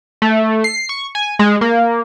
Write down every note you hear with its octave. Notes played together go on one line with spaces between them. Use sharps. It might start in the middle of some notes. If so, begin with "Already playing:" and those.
A3
C7
C#6
G#5
G#3
A#3